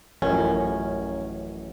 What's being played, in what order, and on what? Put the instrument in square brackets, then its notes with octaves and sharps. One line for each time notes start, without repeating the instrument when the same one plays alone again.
[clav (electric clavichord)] A1 F#2 [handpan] F3 A#4 [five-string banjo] C#4